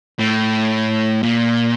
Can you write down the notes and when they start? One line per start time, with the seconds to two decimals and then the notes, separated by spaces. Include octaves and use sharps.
0.19 A2
1.23 A#2